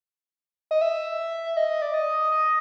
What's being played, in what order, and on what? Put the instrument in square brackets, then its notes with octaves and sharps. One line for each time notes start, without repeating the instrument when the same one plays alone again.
[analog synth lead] D#5
E5
D#5
D5
D#5
D#5